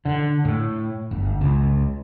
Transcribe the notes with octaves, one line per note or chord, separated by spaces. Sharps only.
D3
A2
G1
C#2